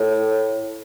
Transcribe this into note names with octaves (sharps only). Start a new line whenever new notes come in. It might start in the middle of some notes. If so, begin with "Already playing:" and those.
Already playing: A2